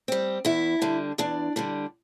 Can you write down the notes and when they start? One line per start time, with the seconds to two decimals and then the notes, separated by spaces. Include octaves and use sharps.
0.08 G3 C4
0.45 E2 E4 E5
0.82 D3 G3 D4
1.18 E2 D4 D5
1.56 D3 G3 D4